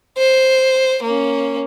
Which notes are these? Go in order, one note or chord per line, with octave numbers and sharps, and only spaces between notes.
C5
A#3 C#4